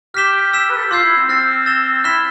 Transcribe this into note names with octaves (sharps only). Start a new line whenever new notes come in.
G4 F6 B6 E7 G7
E6 G6 B6 E7
B4
A4
G4
F4 C6 E6 G6 C7
E4
C4
C4 F6 A6 C7
E6 A6 E7 G7
E4 F6 B6 E7 G7